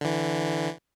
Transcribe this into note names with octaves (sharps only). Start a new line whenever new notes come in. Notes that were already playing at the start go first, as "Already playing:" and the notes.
D3 E3